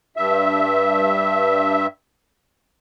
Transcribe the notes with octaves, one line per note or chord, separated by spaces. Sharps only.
G2 E5